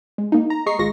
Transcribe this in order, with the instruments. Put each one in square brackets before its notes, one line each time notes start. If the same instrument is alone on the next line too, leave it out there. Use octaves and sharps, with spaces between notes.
[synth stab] G#3
A#3 D#4
A#5
G#3 D#5 A#5 C#6 C7
G#1 G#3 F4 C#6 A#6